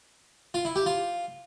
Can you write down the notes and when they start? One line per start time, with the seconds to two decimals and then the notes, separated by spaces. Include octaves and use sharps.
0.54 F4
0.65 E4
0.76 G4
0.86 F4